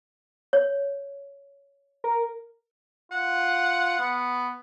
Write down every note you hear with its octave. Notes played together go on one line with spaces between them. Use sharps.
C#5
A#4
F4 F#5
B3